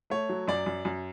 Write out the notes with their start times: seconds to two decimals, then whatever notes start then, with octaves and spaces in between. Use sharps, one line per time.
0.10 A3 C#5
0.29 F#3
0.48 F#2 D5
0.66 F#2
0.85 F#2